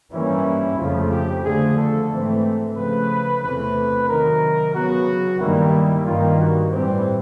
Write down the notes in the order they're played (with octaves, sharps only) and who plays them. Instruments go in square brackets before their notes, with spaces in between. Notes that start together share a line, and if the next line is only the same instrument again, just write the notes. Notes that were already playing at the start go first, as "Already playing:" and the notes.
[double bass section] G2 E3 G3 A#3 C#4 [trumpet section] E4
[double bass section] F2 C#3 F3 A3 [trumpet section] F4
[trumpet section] G4
[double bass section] D3 F3 A3 [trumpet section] G#4
[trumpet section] A4
[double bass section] G#2 E3 A3 C4
[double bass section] C#3 F3 A3 [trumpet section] B4
[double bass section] E2 C3 E3 A3 C4 [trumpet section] B4
[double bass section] C3 D#3 F#3 [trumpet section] A#4
[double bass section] C#3 F#3 B3 [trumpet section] F#4
[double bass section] G2 D#3 G3 A#3 [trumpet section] E4
[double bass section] G2 D#3 G3 A#3 [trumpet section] F4
[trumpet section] F#4
[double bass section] A2 E3 G3 C4 [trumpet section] G4